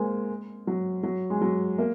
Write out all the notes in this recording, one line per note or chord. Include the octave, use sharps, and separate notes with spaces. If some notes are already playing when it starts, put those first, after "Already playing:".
Already playing: G#3 A#3 C4
F#3
F#3
G#3
F#3
A#3